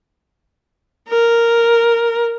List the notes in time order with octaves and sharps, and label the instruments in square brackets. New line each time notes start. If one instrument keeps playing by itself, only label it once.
[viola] A#4